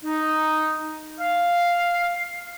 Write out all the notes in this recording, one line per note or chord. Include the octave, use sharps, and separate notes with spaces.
D#4
F5